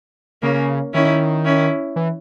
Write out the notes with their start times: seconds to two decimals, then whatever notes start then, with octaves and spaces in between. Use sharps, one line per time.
0.42 C#3 A#3 C#4
0.93 D#3 C#4 E4
1.45 C#4 E4
1.96 E3